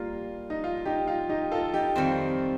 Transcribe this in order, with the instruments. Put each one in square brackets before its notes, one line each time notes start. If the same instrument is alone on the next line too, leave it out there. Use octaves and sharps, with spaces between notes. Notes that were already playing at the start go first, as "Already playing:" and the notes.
Already playing: [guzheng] G3 A#3 [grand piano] F4
[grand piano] D#4
F4
D#4 G4
F4
D#4 G4
F4 A4
D#4 G4
[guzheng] F2 D#3 G3 C4